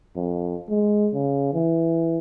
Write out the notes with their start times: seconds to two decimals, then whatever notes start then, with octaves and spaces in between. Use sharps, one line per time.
0.16 F2
0.69 G#3
1.13 C#3
1.54 E3